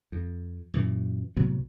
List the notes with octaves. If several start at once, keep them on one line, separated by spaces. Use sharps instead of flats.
F2
F#2 A#2 E3
C2 A2 F#3 B3